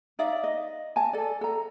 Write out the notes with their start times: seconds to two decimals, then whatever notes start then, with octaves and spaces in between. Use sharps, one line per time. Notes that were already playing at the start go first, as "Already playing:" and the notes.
0.19 D#4 D5 E5 F5
0.44 D#5
0.96 G#5 A5
1.13 A4 D5
1.41 A4 A#5